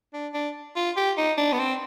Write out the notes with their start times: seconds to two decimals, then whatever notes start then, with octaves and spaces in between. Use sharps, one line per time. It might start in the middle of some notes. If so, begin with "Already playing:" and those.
0.13 D4
0.34 D4
0.76 F4
0.97 G4
1.17 D#4
1.38 D4
1.52 B3
1.59 C4